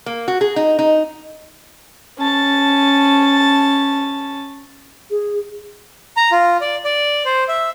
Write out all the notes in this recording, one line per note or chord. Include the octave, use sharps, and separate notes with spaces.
A#3
F#4
G#4
D#4
D#4
C#4 A5
G#4
A#5
F4
D5
D5
C5
E5